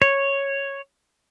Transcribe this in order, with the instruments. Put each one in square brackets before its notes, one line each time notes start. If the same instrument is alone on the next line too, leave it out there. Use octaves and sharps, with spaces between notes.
[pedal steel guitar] C#5